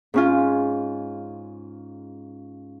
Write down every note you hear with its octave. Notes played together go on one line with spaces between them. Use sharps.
G#2 C#4 F4